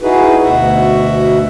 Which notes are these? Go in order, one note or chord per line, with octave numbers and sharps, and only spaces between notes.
D#4 E4 F#4 G#4 B4
D2 B2 F#4 E5 F#5